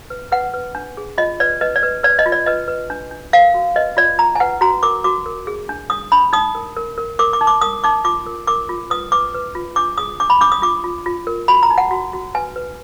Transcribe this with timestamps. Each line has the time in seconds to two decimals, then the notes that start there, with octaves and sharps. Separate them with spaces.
0.10 B4
0.32 B4 F#5
0.54 B4
0.75 D4
0.97 G#4
1.18 F4 D#5
1.40 B4 D5
1.61 B4 D#5
1.76 D5
1.83 B4
2.03 B4 D5
2.19 D#5
2.26 F4
2.32 D5
2.46 B4 D#5
2.68 B4
2.90 D4
3.11 D4
3.33 A#4 F5
3.54 F#4
3.76 B4 D#5
3.97 F4 D5
4.19 F4 A#5
4.35 G#5
4.40 B4 F#5
4.61 F#4 A#5
4.83 A#4 D6
5.04 F#4 D6
5.26 A#4
5.47 G#4
5.69 D4
5.90 D4 D#6
6.12 D4 B5
6.33 D#4 D#6
6.55 A#4
6.76 A#4
6.98 A#4
7.19 A#4 D6
7.33 D6
7.41 D#4
7.47 D6
7.61 A#4 D#6
7.84 D#4 D6
8.04 F4 D6
8.26 A#4
8.47 A#4 D6
8.69 F4
8.90 B4 D#6
9.12 B4 D6
9.34 B4
9.55 F4
9.76 D4 D6
9.98 G#4 D#6
10.20 D4 D6
10.30 B5
10.41 D4 D6
10.52 D#6
10.62 F4 D6
10.84 F4
11.06 F4
11.27 A#4
11.48 F#4 B5
11.63 A#5
11.70 D#4
11.78 F#5
11.91 F#4
12.13 F#4
12.35 B4 G#5
12.56 B4